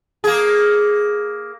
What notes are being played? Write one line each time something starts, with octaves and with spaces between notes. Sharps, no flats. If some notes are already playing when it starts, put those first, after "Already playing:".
A#3 G#4